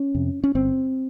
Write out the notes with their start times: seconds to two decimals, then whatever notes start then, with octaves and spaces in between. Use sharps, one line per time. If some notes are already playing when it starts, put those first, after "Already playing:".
Already playing: C#4
0.15 F2 C3
0.44 C#4
0.55 G1 C4